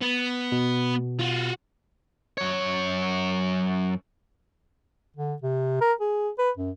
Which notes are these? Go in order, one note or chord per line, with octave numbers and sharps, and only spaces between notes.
B3
B2
F4 F#4
F#2 C#5
D3
C3
A#4
G#4
B4
F#2